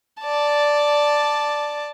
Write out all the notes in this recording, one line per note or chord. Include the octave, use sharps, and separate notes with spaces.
D5 A5